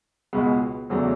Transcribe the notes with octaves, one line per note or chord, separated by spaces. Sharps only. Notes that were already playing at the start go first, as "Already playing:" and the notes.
C#2 B2 G#3 B3
E2 C#3 F#3 A3 D4